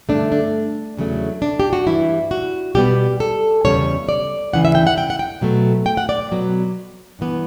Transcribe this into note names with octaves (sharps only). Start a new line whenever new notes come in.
G2 D3 A3 D4
D4
E2 C#3 F#3 A3
D4
G4
F#4
G2 E3 G3 E4
F#4
B2 G3 B3 G4
A4
E2 C#3 G3 C#5
D5
D2 C#3 E3 F#5
E5
G5
F#5
G5
F#5
G5
B2 F#3 A3
G5
F#5
D5
B2 F#3 B3
G2 E3 B3